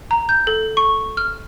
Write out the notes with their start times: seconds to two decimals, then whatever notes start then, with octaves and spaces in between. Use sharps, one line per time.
0.11 A#5
0.29 G6
0.47 A4
0.77 C#6
1.17 F6